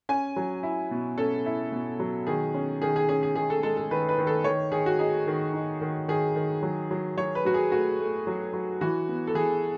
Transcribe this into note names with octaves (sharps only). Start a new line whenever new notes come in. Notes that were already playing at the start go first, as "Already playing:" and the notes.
C#4 G#5
F#3
E4
B2
C#4 A4
E4
B2
F#3
D#3 G#4
C#4
D#3 G#4
G#4
C#4 G#4
G#4
D#3 G#4
A4
G#3 A4
A4
D#3 B4
B4
D#3
A4
D#3 C#5
D#3 G#4
F#4
D#4 G#4
D#3
D#4
D#3
D#3 G#4
D#3
F#3
F#3
F#3 C#5
B4
F#3 F#4
G#4
A3 F#4
A3
F#3
F#3
E3 F#4
B3
A4
E3 G#4